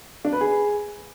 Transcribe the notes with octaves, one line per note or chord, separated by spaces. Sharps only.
D4
B4
G#4